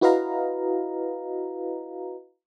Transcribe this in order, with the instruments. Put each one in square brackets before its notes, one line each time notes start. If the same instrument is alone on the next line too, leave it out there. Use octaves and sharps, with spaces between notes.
[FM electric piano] E4 F#4 B4 D#5 F5 A#5